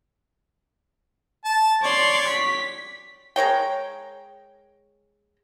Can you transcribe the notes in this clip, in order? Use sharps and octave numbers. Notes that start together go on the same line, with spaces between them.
A5
C#5 D5 C6
B6
G#3 A#4 C#5 G5